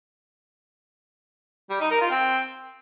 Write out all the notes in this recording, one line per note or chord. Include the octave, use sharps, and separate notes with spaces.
G3
D#4
A#4
F4
C4